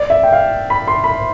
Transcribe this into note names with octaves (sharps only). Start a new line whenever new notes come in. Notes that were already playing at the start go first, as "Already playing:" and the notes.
Already playing: D5
E5
G5
F5
B5
C6
B5